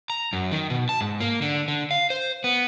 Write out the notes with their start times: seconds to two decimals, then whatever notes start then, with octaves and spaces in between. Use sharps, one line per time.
0.10 A#5
0.33 F#2
0.51 D#3
0.70 B2
0.89 A5
1.01 G#2
1.20 A#3
1.42 D3
1.68 D3
1.91 F5
2.10 C5
2.44 B3